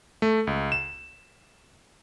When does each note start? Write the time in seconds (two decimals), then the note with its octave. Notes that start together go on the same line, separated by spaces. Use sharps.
0.22 A3
0.47 C#2
0.72 E7